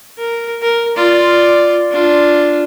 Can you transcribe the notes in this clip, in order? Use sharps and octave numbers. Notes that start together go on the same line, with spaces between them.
A#4
A#4
F4 D5
D4 F4